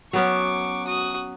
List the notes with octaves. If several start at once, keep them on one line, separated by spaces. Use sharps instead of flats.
F#3 B3 C#4 C#6 D6
F#4 D#6